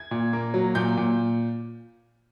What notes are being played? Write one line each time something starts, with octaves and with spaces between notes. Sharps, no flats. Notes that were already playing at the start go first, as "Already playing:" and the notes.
Already playing: G#6
A#2
A#3
F#3
A#2 G6
A#2